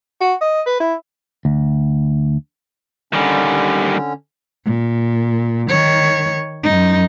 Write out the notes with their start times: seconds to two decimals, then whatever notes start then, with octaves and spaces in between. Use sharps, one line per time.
0.21 F#4
0.41 D#5
0.67 B4
0.80 E4
1.45 D2
3.13 D3 D#3 G3 C#4
4.65 A#2
5.69 D#3 C#5
6.63 F#2 D#4